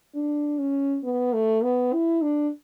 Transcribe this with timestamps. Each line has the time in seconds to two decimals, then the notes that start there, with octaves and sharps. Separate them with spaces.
0.15 D4
0.59 C#4
1.04 B3
1.33 A3
1.64 B3
1.93 E4
2.22 D4